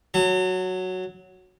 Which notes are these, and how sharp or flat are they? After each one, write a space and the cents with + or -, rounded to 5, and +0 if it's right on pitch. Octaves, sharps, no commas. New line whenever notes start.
F#3 +0 A#5 -45